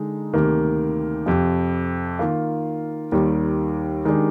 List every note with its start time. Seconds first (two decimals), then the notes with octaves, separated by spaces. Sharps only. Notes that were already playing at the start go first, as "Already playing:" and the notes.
Already playing: D3 G#3 D#4
0.34 D2 C3 D#3 A#3
1.26 F2 C3 F3
2.19 D#3 A#3 F4
3.12 D#2 D#3 G3
4.05 D#3 G#3 D4 G4